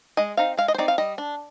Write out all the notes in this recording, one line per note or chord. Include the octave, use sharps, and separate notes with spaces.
G#3 D#5
C4 D#4 F5
G#3 F5
D#5
C5
C4 D#4 D5
F5
G3 D#5
D4